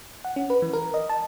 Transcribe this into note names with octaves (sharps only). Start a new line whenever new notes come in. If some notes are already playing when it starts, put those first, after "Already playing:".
F#5
C#4
B4
E3
A#4
D#5
A5